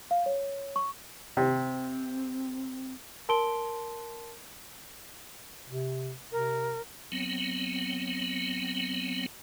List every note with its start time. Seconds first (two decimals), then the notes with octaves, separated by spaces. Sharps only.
0.11 F5
0.26 C#5
0.76 C#6
1.37 C3 C4
3.29 A#4 A5 C6 D7 G7
5.69 C3
6.32 C3 A#4
7.12 F#3 B3 C4